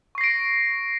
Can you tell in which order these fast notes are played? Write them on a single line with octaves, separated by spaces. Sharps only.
C#6 C7 A#6 D7